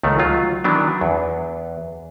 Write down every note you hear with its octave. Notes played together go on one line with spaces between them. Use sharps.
C#2 D#3 A3
F#3 F4
D#3 E3 F#3 B3 D4
E2